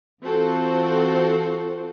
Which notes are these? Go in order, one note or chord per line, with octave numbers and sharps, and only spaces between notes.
E3 C4 F4 F#4 A4 C5